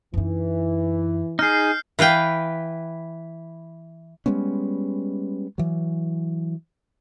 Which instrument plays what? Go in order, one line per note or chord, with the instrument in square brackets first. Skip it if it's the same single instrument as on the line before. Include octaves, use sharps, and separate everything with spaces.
[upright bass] F#2 D#4 [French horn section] E3
[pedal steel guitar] D#4 G#4 [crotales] F6 G6 C7
[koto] E3 B4 F5 G5
[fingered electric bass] G3 G#3 B3 C#4
E3 F#3